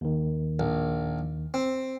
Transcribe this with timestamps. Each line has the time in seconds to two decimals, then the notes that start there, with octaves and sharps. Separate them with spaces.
0.01 D#2 D#3
0.59 A#1
1.54 C4